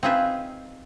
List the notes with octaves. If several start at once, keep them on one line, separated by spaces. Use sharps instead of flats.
C4 D#4 F4 G#4 B4 E5